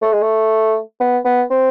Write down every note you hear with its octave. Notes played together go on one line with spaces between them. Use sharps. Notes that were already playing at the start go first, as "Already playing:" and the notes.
A3
G#3
A3
B3
B3
C4